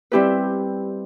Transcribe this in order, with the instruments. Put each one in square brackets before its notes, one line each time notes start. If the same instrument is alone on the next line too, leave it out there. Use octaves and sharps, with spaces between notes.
[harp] G3 C4 E4 G4 B4